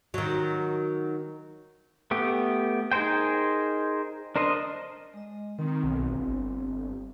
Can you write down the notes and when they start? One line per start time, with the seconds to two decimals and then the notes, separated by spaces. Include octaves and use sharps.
0.14 D#3 F#3
2.11 A3 B3 G4
2.92 D#4 G#4 A#4 C5 G5
4.36 D4 A#4 C5 D#5
5.14 G#3 D#5
5.59 D#3 C4
5.84 B1
6.11 G1